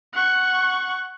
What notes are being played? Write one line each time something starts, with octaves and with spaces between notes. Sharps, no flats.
F#5 C#6